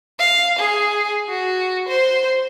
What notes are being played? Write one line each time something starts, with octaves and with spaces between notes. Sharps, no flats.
F5
G#4
F#4
C5